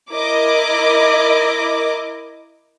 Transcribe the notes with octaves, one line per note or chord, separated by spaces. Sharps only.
E4 A#4 D#5 D6